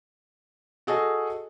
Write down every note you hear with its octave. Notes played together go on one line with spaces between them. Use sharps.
F#4 G#4 A4 D#5